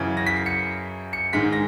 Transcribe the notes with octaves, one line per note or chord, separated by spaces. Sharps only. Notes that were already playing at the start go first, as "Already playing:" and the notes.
Already playing: F#2 C#3 E3
A#6
B6
C7
C#7
C#7
G#2 D#3 G#3 B6
A#6